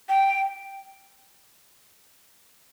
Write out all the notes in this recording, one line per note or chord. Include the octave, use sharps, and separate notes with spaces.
G5